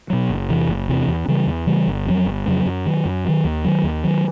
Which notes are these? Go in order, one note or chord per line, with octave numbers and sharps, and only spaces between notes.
B2 F#3
F#1
E2 C3 E3
F#1
E2 C3 E3
E2
C#3 E3 G3
E2
C#3 E3 G3
G1
F2 C#3 F#3
G1
F2 C#3 F#3
F#2
D#3 F#3
F#2
D#3 F#3
D#2
D#3 F#3
D#2
D#3 F#3